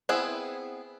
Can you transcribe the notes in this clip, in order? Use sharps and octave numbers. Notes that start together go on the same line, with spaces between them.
B3 C4 E4 G#4